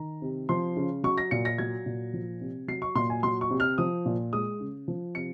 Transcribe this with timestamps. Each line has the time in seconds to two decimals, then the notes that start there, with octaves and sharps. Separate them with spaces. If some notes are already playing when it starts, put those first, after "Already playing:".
Already playing: D#3 A#5
0.22 C3
0.49 F3 C6
0.77 C#3
1.03 F#3 C#6
1.18 A#6
1.31 A#2 C#7
1.45 A#6
1.58 F#3 G#6
1.86 A#2
2.13 F3
2.41 C3
2.68 F#3 C7
2.82 C#6
2.95 A#2 C6
3.10 G#5
3.23 F#3 C6
3.41 C#6
3.50 C3
3.60 F6
3.78 F3 D#6
4.06 A#2
4.33 G#3 D#6
4.60 C#3
4.88 F3
5.15 C3 C#7